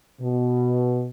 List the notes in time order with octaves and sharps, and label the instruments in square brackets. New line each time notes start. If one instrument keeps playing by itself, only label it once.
[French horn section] B2